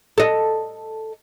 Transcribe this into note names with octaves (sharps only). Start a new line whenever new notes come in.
A4 D#5